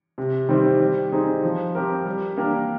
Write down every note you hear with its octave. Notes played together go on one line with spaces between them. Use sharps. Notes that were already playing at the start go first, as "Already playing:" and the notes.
C3
D#3 G3 C4
G3
C4 D#4 G#4
F3
C4 G4 A#4
G3
A#3 D4 G4 A#4